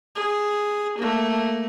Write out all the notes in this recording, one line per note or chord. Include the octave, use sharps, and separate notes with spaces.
G#4
A3 A#3